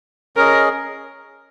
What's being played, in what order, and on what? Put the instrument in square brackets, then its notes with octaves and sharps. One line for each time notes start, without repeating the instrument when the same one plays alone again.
[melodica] C#4 G#4 D#5 [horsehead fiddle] A#4